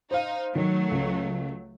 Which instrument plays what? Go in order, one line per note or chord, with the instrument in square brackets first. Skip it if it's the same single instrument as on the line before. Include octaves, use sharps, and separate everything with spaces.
[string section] D#4 [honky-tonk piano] C5 F5
[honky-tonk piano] D#3 [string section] F#3 A3
[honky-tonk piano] C#2